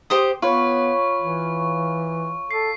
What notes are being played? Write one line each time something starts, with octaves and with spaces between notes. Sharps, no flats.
G4 C5 D#6
B3 F4 B4 C#5 C#6
E3
A4 C7